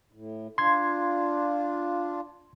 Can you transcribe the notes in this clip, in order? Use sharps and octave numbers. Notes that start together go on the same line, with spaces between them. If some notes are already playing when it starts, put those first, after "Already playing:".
A2
D4 F4 C6 G#6